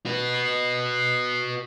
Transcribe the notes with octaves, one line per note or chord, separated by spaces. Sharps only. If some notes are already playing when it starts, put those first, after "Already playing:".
F#4 B4